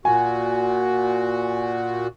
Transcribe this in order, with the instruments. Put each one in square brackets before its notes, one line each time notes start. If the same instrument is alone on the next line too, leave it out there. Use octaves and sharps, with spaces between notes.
[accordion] A#2 F#4 [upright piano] G#5